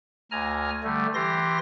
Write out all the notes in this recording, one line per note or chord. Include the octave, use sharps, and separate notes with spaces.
D2 G#5 A#5 F6
D3 G3 A3
E3 G4 C6 A#6